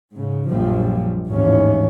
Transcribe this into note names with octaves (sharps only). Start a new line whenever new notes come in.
G#2 C#3
A#1 F#2 F3 G3
G#1 D#2 A2 E3 C#4